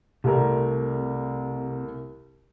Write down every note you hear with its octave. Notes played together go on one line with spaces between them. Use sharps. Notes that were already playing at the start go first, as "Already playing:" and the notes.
C2 C3 A3 A#4